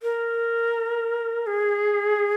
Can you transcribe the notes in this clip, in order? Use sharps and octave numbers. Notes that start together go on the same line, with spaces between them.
A#4
G#4